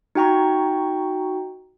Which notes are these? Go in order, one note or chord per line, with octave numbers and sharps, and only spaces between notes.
D#4 F#4 G5 A#5 C#6